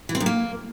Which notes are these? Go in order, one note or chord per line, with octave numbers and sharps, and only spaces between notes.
E3
C4
F#2
A#3